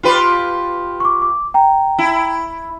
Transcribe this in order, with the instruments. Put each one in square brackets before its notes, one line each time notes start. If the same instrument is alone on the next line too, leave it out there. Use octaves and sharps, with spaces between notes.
[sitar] F4 G4 B4
[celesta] C#6 D6
D6
G5 A#5
[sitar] E4